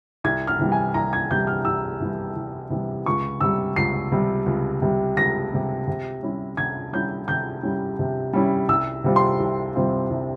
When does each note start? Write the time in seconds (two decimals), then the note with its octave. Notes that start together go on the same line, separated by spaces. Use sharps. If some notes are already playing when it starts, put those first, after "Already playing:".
0.24 C2 G#6
0.47 F6
0.59 C3 E3 G3
0.72 G#5
0.94 C2 A#5
1.13 G#6
1.31 C3 E3 G3 G6
1.47 F6
1.65 C2 E6
2.00 C3 E3 G3
2.36 C2
2.70 C3 E3 G3
3.06 C#2 C#6
3.41 C3 G3 E6
3.76 C#2 C7
4.12 C3 G3
4.46 C#2
4.82 C3 G3
5.17 C#2 A#6
5.52 C3 G3
5.88 C3
6.23 G3 C#4 E4
6.57 C3 G#6
6.93 G3 C#4 E4 G6
7.28 C3 G6
7.63 G3 C#4 E4
7.99 C3
8.33 G3 C#4 E4
8.69 C2 E6
9.04 C3 G3 C4 F4
9.16 C6
9.40 C2
9.75 C3 G3 C4 F4
10.10 C2